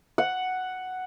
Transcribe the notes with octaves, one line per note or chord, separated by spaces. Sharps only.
F#5